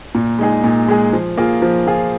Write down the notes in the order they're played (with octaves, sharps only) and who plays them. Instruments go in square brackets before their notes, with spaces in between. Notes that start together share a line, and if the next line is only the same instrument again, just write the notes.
[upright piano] A#2
G#3 D#4 G#4
A#2
G#3 D#4 G#4
F3
A#3 F4 G#4
F3
A#3 F4 G#4